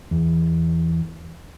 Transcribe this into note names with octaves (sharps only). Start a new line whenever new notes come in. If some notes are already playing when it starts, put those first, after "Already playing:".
E2